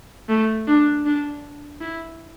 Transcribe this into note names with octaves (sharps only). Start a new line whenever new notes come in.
A3
D4
D4
E4